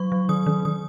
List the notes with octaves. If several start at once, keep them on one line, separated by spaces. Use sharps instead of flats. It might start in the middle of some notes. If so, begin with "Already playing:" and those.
Already playing: F#3 C#6
F#3
D#3 D#6
D#3
D#3 D#6